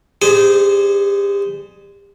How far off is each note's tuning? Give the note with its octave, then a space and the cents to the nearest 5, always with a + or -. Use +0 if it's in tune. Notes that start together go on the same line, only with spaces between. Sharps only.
G3 +30 G#4 +5 C5 -20